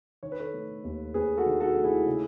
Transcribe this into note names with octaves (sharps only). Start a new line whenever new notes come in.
D#3 C#5
B4
A4 C#5
A3
D#2
D#2 G#4 B4
F#4 A4
D#3
F#4 A4
A3
E4 G#4
C#3